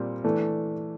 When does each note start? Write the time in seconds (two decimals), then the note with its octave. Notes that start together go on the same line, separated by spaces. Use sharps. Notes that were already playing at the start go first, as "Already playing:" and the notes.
Already playing: A#2 G3 C4
0.24 E3 A3 D4